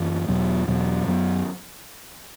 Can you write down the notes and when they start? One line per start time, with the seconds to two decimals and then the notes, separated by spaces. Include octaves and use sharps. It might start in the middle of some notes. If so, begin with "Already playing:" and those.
Already playing: F#2 E3
0.28 E2 B2 F#3 B3
0.67 E2 B2 F#3 B3
1.07 F#2 F#3 B3